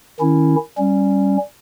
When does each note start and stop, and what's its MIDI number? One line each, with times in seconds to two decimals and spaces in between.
0.20 0.56 51
0.20 0.56 61
0.20 0.56 64
0.78 1.37 55
0.78 1.37 61